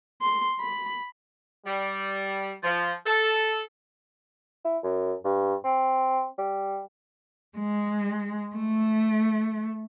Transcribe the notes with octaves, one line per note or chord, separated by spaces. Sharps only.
C6
B5
G3
F3
A4
E4
F#2
G2
C4
G3
G#3
A3